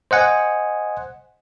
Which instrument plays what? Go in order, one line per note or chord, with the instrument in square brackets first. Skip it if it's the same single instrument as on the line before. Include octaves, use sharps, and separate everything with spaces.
[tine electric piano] C5 D#5 F#5 G#5